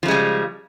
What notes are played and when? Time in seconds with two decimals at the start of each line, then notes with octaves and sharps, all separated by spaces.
0.03 F3
0.06 C#3
0.08 G#3
0.11 G3